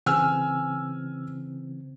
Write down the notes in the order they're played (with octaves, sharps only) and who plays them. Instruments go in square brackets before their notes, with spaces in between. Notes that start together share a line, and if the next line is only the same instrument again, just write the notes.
[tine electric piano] C#3 E3 C4 [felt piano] G#5 E6 F6